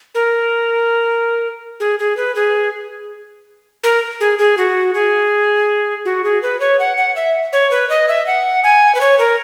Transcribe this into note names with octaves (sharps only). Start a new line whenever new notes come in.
A#4
G#4
G#4
B4
G#4
A#4
G#4
G#4
F#4
G#4
F#4
G#4
B4
C#5
F#5
F#5
E5
C#5
B4
D#5
E5
F#5
G#5
B4
C#5
A#4